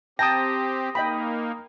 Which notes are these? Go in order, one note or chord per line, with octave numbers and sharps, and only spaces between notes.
C4 G4 G5 A5 A#5 D#6 A#6
A#3 D#4 D#5 G5 B5